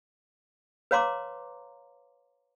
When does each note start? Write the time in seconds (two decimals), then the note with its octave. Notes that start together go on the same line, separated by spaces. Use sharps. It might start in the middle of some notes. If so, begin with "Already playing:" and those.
0.91 B4 C#5 F5 A#5 C6 D6